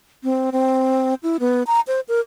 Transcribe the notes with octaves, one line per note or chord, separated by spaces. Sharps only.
C4
C4
E4
B3
A#5
C5
A#4